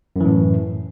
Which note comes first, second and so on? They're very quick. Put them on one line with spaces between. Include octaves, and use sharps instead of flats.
F#2 E3 A2